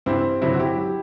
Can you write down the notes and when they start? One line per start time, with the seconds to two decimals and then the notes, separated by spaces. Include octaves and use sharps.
0.06 G2 E3 C4 E4
0.42 G2 D3 F#3 C4 E4
0.54 F#4
0.59 E4 G4
0.77 F#3